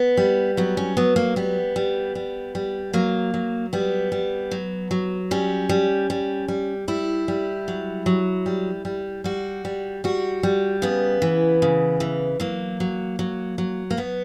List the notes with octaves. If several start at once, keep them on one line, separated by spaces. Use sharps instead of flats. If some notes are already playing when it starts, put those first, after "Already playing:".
Already playing: B3
G3
F#3 B3
C#4
F#3 B3
A#3
G3 B3
G3
G3
G3
F#3 A#3
F#3
G3 B3
G3
F#3
F#3
G3 C#4
G3
G3
G3
G3 E4
G3
F#3
F#3
G3
G3
G3 F#4
G3
G3 F#4
G3
C#3 B3
E3
C#3
E3
F#3 A#3
F#3
F#3
F#3
A#3
F#3 B3